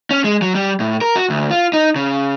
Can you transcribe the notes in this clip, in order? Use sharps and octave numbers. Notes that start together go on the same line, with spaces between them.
C#4
G#3
F#3
G3
A2
A#4
F#4
D2
F4
D#4
C#3